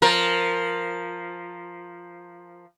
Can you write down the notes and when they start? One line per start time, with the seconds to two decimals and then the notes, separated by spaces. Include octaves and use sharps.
0.02 F3 A#4